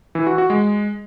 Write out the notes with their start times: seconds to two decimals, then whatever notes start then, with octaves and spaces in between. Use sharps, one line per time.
0.15 E3
0.27 F#4
0.38 F#4
0.50 G#3